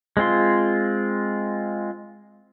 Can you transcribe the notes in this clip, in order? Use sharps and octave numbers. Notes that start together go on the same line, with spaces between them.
G#3 C4 F4 C6